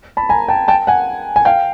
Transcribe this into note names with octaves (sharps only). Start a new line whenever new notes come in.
A5 B5
G#5 A#5
G5 A5
G5 A5
F#5 G#5
G#5
F5 G5